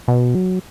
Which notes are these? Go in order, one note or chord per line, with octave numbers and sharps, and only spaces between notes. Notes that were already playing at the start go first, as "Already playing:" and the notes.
B2
F#3